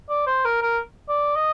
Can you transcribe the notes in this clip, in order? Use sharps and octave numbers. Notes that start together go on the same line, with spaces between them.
D5
C5
A#4
A#4
D5
D#5